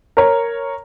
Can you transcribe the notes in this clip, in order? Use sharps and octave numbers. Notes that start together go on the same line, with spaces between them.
A#4 C#5